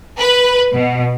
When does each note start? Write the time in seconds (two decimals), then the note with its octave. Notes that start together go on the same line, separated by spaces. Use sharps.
0.19 B4
0.73 B2